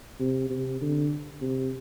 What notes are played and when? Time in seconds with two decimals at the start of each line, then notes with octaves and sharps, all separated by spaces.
0.20 C3
0.50 C3
0.81 D3
1.41 C3